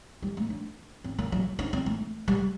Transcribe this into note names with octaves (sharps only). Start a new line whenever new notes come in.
G3
A3
D4
C4
A#3
F#3
D4
C4
A3
G3